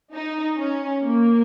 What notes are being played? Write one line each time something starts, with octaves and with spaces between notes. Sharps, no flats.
D#4
C#4
A#3